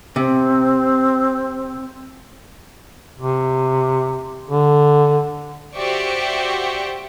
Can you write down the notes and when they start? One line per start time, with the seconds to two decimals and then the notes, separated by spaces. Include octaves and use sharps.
0.16 C3 C4
3.20 C3
4.50 D3
5.75 F#4 G4 C5 D5 E5 C#6